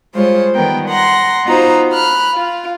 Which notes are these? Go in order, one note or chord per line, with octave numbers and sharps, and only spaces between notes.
G3 G#3 F4 C5 C#5
D#3 G3 B3 A#4 G5
F#5 A#5 C6 A#6
B3 D#4 F4 F#4 C5 A#5
B5 F6 F#6
F4